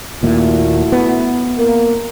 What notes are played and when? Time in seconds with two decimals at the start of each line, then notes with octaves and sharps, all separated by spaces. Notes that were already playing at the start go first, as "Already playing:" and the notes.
0.23 D#2 A#2 A3 E4 F#4
0.92 B3
1.57 A#3 A#4